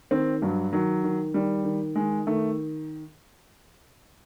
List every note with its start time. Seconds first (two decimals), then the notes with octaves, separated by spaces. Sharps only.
0.11 D#3 C4
0.42 G2 F#3
0.73 D#3 F#3
1.04 D#3
1.34 D#3 G3
1.65 D#3
1.95 D#3 G#3
2.27 D#3 A3